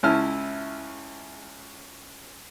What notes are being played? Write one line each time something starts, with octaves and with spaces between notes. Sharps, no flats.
C#2 C#4 E4 A5 F6